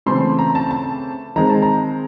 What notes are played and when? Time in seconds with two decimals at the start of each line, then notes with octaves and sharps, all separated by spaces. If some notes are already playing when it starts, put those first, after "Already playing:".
0.06 C#3 E3 A3 C4 C6
0.39 A#5
0.55 A5
0.71 A5
1.36 D#3 G#3 C4 A#5
1.50 A5
1.62 A#5